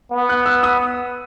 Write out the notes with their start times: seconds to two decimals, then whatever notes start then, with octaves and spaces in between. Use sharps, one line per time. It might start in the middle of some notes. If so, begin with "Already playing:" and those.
0.11 B3
0.29 F#6
0.46 E6
0.63 D#6